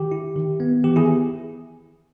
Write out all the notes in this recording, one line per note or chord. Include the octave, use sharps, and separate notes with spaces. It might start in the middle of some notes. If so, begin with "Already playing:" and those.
Already playing: D#3 G4
E4
D#3
B3
E3 G4
E4 G#4